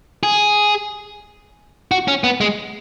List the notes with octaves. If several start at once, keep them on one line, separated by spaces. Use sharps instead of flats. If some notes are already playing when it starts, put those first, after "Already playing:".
G#4
F#4
C#4
B3
G#3